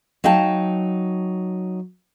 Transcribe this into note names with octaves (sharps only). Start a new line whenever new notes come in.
F#3 D#4 F5 G5 A5